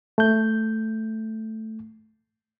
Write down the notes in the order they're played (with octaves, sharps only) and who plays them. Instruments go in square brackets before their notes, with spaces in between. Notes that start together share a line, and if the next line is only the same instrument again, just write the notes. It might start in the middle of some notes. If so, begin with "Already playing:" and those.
[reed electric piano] A3 G6